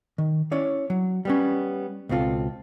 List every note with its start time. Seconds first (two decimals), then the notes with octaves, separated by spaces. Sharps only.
0.18 D#3
0.52 C#4 E4 C#5 D5
0.90 F#3
1.25 G3 B3 C#4
2.09 C#2 B2 C4 F4 A4